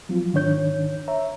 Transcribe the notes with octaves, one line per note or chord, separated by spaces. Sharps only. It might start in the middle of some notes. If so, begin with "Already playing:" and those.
F3 F#3 C4 F4
G#2 D#3 D4 C#5 G6
C#5 E5 A#5